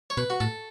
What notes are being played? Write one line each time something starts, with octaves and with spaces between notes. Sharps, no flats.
C#5
B2 B4
F#4
A2 A4